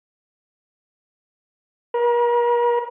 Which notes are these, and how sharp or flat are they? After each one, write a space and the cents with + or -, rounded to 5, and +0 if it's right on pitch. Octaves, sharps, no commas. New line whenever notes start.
A#4 +40